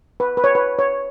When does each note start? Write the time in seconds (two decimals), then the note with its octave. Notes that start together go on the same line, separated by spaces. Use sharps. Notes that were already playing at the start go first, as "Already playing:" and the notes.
0.20 B4
0.37 B4
0.44 C#5
0.55 B4
0.79 C#5